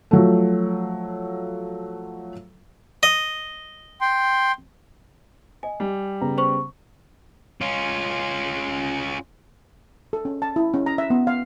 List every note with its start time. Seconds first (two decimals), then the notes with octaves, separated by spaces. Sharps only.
0.11 F3 F#3 A3
3.03 D#5
4.01 G5 C6
5.63 D#5 G#5
5.80 G3
6.21 C#3 B3 A#5
6.38 C5 C#6
7.61 C#4 F4
10.13 A4
10.25 C#4
10.42 A5
10.56 E4
10.74 C#4
10.86 A#5
10.98 E5
11.10 B3
11.27 F5